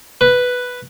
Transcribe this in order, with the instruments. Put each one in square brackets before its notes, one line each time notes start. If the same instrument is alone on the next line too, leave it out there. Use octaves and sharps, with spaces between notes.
[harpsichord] B4